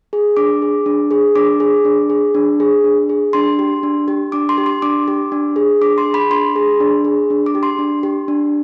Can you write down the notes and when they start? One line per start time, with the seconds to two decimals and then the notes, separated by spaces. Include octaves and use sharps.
0.13 G#4
0.37 D4 D6
0.62 G#4
0.86 D4
1.11 G#4
1.36 D4 D6
1.60 G#4
1.85 D4
2.10 G#4
2.35 D4
2.60 G#4
2.84 D4
3.09 G#4
3.33 D4 C6
3.59 G4
3.83 D4
4.08 G4
4.32 D4 D6
4.49 C6
4.58 G4
4.66 C6
4.82 D4 D6
5.08 G4
5.32 D4
5.56 G#4
5.81 D4 D6
5.98 C6
6.05 G#4
6.14 B5
6.30 D4 C6
6.56 G#4
6.80 D4
7.05 G#4
7.30 D4
7.46 D6
7.55 G4
7.63 C6
7.79 D4
8.03 G4
8.28 D4